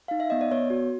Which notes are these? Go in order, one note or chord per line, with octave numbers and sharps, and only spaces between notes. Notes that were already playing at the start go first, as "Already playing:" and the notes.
D#4 F5
E5
B3 D#5
D5
B3 C#5
F#4